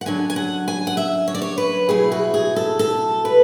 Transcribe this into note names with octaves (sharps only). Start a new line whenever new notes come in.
F#5
F#2 D3 F#3 G#5
G#5
F#5
G#5
F#5
E5
C#5
D5
C#5
B4
B2 F#3 A3 E4 G#4
F#4
G#4
A4
A4
B4